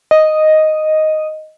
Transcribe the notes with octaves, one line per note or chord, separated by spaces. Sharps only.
D#5